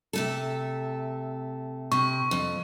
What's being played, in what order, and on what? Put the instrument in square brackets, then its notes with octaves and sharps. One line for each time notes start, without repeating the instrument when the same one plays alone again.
[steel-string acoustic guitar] C3 A3 A4
[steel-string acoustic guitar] C3 [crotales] C#6
[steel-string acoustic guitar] F2